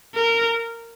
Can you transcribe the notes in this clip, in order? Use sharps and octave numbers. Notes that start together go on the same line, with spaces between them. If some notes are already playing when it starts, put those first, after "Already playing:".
A#4